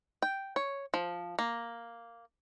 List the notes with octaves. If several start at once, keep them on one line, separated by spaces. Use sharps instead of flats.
G5
C#5
F3
A#3